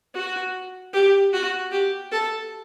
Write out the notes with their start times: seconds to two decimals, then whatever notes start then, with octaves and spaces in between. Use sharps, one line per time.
0.14 F#4
0.93 G4
1.33 F#4
1.72 G4
2.12 A4